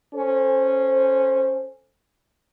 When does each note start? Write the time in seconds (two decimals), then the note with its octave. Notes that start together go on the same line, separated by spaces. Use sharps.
0.15 C#4 A4 C5